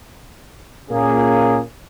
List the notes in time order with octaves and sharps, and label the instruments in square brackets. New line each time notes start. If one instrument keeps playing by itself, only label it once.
[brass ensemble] A#2 A#3 C#4 G#4